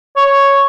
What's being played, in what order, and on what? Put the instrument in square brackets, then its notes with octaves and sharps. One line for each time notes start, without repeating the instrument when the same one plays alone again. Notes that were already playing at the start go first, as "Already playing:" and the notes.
[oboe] C#5